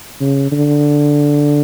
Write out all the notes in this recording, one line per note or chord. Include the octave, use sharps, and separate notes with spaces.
C#3
D3